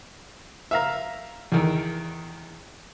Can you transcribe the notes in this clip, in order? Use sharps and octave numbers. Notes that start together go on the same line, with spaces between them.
E5 F5 A#5
E2 D#3